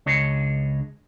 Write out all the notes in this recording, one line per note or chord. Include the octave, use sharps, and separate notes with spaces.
C#2 D4 G#4 C#5 D#5